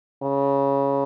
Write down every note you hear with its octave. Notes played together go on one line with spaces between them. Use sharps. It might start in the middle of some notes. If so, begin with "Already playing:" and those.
C#3